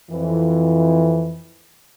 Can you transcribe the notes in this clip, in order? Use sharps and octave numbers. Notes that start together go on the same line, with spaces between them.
F2 E3